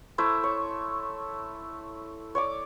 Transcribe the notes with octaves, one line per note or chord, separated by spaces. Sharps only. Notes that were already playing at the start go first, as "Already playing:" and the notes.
A3 E4 C5
C#5
C#5 D5 D6